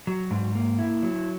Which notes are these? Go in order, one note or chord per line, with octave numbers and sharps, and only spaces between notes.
F#3
G#2
A#3
E4
F#3